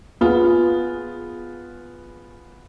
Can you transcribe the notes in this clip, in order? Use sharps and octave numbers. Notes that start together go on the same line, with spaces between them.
B3 F4 G#4